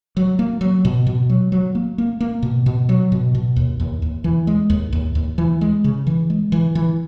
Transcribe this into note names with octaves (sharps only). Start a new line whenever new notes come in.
F#3
A#3
F#3
B2
B2
F#3
F#3
A#3
A#3
A#3
B2
B2
F#3
B2
B2
D#2
D#2
D#2
E3
G#3
D#2
D#2
D#2
E3
G#3
C#3
E3
G#3
E3
E3